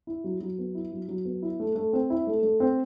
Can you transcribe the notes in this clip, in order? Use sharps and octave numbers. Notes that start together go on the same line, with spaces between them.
E4
F#3
F#3
B3
E4
F#3
F#3
B3
E4
A3
A3
C4
E4
A3
A3
C4